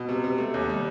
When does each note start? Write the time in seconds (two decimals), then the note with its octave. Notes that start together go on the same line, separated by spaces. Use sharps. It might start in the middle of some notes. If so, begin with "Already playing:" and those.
Already playing: B2
0.09 C3
0.24 C3
0.38 A3
0.54 D#2
0.69 G3